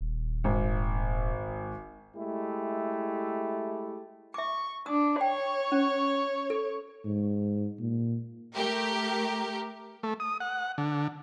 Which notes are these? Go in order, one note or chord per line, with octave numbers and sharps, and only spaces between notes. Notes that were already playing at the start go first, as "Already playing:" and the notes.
D#1
G#1
G#3 A3 E4 G4
E5 C#6 D6
D4 D#6
C#5 G5
C#4
A4
G#2
A#2
A3 G4 A#4
A3
D#6
F#5
D3